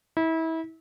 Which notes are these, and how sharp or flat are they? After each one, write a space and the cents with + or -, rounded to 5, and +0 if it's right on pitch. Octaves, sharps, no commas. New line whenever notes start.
E4 -30